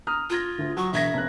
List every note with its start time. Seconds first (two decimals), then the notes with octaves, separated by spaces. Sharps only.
0.07 A#5 D#6 F6
0.30 F4 F6 G#6 A#6
0.59 D2
0.77 F#3 C#6
0.93 E1 E5 G#6 A#6
1.14 F1 F#6